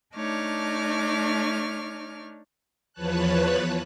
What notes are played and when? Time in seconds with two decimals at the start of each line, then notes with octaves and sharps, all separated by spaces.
0.15 A3 D4 D#4 C#5 D6 F6
2.93 E2 F3 B4 C#5 A5 F#6